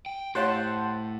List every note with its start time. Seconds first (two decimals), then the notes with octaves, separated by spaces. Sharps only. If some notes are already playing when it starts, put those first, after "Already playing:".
0.06 G5
0.35 A2 G4 C5 C#5 F5 F#5 A5